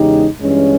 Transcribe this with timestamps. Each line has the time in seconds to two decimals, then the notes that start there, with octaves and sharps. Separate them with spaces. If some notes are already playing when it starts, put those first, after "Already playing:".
Already playing: E2 C#3 G#3 D#4 G4
0.39 G2 E3 G#3 C#4